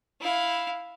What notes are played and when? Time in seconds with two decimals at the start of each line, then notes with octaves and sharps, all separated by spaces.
0.21 E4 F5